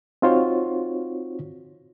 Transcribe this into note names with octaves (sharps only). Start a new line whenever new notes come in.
C4 D#4 F4 F#4 C5 C#5